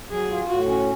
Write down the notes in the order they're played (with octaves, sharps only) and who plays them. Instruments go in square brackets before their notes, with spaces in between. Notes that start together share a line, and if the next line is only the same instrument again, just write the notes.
[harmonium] F#3 [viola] G#4
[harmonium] F4
[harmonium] A2 [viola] F#4
[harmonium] C#4